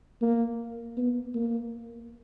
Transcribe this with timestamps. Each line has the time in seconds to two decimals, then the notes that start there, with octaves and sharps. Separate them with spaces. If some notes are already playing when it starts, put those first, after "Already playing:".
0.22 A#3
0.97 B3
1.35 A#3